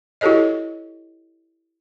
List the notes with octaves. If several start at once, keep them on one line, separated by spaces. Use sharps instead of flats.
E4 F#4 G4 A4 C#5 D#5